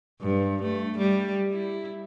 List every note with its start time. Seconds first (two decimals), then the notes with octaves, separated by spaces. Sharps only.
0.21 G2
0.62 A3
0.98 G3
1.51 E4